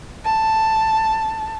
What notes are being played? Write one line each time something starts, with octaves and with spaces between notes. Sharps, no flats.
A5